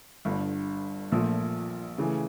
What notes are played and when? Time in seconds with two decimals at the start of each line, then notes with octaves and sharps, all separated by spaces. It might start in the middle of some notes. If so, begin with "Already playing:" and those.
0.25 G1 G2 D3
1.12 A#1 A#2 F3 A3
1.98 C#3 E3 A3